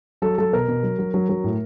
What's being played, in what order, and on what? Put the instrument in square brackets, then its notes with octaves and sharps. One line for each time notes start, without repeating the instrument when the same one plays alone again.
[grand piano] F#3 A4
F#3 A4
B2 A#4
B2
F#3
F#3
F#3
F#3
A2